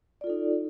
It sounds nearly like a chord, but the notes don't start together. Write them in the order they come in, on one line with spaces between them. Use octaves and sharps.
D5 F4 A4 D#4